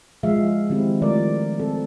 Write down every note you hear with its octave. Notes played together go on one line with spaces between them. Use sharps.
F3 G#3 E5 F5
D#3 G#3 C4 E4 G4
D#3 F3 A3 A#4 D5
C4 A4